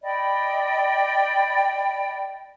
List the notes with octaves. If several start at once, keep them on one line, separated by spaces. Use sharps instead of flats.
D5 D#5 G5 B5